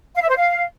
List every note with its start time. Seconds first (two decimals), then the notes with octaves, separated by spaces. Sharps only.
0.15 F5
0.22 E5
0.29 C5
0.36 F5